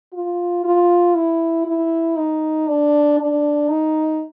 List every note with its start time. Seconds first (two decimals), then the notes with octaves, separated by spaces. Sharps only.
0.13 F4
0.64 F4
1.14 E4
1.66 E4
2.17 D#4
2.68 D4
3.19 D4
3.70 D#4